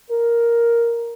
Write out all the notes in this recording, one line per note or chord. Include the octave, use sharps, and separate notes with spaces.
A#4